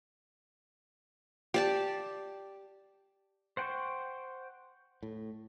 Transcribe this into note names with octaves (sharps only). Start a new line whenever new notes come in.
G4 D5 A5
C5 F#5 G5 C6 C#6
A2